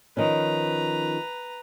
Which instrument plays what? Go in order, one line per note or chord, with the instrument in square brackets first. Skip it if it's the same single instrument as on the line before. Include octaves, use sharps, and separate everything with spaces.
[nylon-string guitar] D#3 F3 C#4 [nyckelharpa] B4 A#5